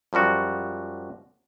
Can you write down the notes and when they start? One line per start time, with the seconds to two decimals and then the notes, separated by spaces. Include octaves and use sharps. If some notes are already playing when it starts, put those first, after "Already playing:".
0.13 F#2 F3 G3 F#4